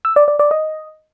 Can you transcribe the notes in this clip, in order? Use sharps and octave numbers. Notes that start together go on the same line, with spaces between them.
E6
D5
D5
D5
D#5